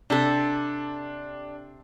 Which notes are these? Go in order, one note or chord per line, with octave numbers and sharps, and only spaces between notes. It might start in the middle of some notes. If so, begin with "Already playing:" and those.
C3 D4 A4